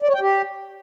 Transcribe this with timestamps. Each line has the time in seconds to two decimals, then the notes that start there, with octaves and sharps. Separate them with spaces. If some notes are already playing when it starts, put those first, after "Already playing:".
0.02 D5
0.08 C#5
0.15 G5
0.21 G4